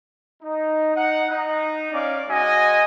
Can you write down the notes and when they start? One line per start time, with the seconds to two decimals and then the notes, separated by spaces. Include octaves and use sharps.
0.42 D#4
0.94 D#4 F#5
1.29 D#4
1.92 C#4 D5 F5 D6
2.29 G#3 F#4 D#5 G#5